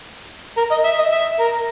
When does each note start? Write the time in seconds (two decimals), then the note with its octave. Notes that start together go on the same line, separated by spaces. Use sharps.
0.57 A#4
0.71 D#5
0.85 E5
0.99 D#5
1.12 E5
1.40 A#4